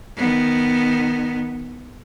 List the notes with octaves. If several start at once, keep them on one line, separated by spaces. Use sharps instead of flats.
D#3 B3